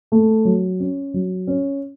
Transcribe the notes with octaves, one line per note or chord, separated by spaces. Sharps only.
A3
F#3
C#4
F#3
C#4